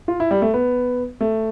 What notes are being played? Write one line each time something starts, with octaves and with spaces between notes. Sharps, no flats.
F4
E4
G3
A3
B3
A3